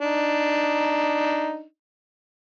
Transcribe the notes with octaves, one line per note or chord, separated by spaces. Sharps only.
D4 D#4